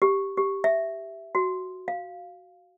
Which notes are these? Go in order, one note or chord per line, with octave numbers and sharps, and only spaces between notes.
G4
G4
E5
F#4
F5